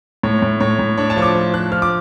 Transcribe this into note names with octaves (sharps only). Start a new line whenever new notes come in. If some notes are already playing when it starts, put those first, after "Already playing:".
A2 C#5
A2
A2 C#5
A2
D4 C#5
A5
F3 C#6
D6
F3
F3 F#6
F3 F6
D6